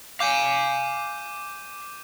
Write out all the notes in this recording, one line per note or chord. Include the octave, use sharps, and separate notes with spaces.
F5 G#5 D6 G6 D#7